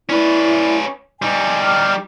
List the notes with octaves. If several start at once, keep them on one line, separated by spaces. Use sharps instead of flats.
C#4 E4 B4 D5
G3 D#4 G#5
G5 D6 F6